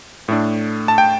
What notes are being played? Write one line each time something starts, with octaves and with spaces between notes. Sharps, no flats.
A2 A3 D4
A5
G5